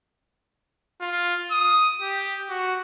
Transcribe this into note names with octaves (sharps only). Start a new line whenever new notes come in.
F4
D#6
G4
F#4